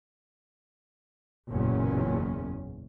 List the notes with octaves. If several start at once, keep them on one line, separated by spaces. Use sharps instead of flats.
F#1 B1 E2 A#2 C#4